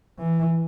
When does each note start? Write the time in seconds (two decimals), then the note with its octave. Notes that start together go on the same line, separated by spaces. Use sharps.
0.19 E3